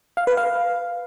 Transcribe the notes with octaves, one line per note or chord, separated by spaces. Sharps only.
F5
B4
F5